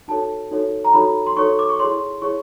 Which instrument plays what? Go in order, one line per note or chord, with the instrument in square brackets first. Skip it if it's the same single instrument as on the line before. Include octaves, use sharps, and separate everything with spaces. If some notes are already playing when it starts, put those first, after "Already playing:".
[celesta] D#4 F#4 A4 C#5 A5
D#4 F#4 A4 C#5
A#5
D#4 F#4 A4 C#5 B5
C6
D#4 F#4 A4 C#5 C#6
D6
C#6
E4 G#4 C#5 C6
E4 G#4 C#5 C#6